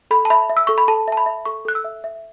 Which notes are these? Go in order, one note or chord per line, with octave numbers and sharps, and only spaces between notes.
A4 B5
A5
E5 B5
E5
E6
A4 C#6
B5
A4 A5
E5 A5
B5
E5
A4 C#6
A4 F#6
E6
E5
E5